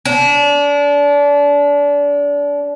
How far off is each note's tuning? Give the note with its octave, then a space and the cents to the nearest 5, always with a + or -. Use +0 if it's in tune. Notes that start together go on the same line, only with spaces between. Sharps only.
D4 -30